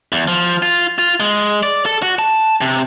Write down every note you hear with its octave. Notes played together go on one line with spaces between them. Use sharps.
E2
F3
F4
F4
G#3
D5
A4
F#4
A5
C3